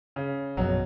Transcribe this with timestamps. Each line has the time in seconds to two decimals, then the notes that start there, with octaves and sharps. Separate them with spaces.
0.16 C#3
0.57 A#1 F#2 B2 F#3